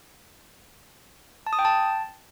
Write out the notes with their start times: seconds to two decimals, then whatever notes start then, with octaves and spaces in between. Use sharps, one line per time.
1.47 A5
1.53 D#6
1.59 G5
1.65 A5